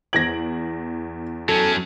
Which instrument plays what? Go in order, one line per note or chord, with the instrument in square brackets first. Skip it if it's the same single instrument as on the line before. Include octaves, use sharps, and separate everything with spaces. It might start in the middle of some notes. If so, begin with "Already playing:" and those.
[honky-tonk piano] E2 D7 F#7 [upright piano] G#6 A#6
[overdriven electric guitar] F#3 C#4 [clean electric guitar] A4